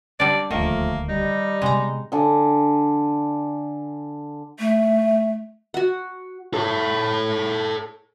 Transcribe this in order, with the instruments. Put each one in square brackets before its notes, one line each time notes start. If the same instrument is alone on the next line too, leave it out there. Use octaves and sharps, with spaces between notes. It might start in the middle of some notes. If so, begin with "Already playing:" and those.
[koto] G3 D4 [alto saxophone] D5
[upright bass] D#1 D2 [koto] D#3 [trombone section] F3 A3 [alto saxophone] A#3
[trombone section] G3 [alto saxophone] D#4
[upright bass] C3 B3 [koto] G#3 A#5
[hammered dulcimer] D3 G#5
[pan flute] A3
[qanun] F#4 F#5
[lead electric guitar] A4 C#5